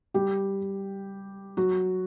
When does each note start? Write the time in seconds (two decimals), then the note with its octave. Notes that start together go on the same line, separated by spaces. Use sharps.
0.14 G3 G4
1.57 F#3 F#4